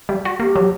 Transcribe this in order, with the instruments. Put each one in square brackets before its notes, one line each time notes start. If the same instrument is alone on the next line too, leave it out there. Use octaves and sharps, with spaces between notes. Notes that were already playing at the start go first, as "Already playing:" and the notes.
[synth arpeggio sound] G3
F#4
[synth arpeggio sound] A#3 [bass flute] G4
[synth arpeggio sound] F#3